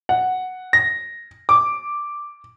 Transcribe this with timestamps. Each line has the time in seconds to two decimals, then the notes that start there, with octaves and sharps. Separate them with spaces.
0.09 F#5
0.73 A#6
1.49 D6